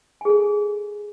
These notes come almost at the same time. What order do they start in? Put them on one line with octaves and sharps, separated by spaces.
G#5 G#4 A4